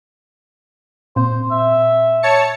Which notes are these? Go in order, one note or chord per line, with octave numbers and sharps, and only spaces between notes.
A#2 C4 C5
E5
C#5 A5 C#7